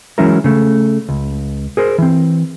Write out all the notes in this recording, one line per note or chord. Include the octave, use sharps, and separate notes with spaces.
E3 F#3 G#3 C#4 E4 A#4
C#3 A3
C#2
G#4 A#4 C5
E3 C4